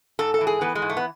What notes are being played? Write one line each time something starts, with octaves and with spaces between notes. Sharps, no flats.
G#2 A4
A4
E3
G#4
E3 B3
G#3
G#2
A3
B3